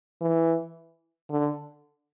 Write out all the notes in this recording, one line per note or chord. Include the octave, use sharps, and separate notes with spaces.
E3
D3